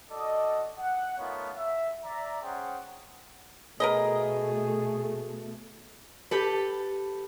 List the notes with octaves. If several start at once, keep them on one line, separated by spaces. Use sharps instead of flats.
F#4 A4 D5 D#5
F#5
A3 B3 D#4 F4 A#4 C#5
E5
D5 E5 A#5
C#4 G#4 C5 F#5 G5
B2 A3 G#4 A#4 B4 D#5
G4 A4 B4